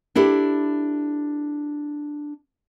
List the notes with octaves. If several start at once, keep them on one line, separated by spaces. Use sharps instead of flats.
D4 E4 G4 A4